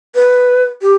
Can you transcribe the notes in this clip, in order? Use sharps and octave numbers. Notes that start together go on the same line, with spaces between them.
B4
G4